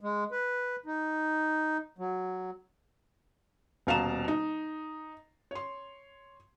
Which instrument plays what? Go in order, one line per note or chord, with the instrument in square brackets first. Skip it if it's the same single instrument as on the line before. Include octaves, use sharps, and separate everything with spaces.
[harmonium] G#3
B4
D#4
F#3
[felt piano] D#1 B2 F5 A5 A#5 E7
D#4
C#5 C6